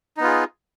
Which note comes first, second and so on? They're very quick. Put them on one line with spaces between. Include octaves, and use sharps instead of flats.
D#4 B3 F4 G#4